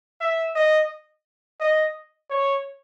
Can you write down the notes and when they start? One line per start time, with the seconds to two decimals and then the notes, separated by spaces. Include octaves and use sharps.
0.21 E5
0.56 D#5
1.60 D#5
2.30 C#5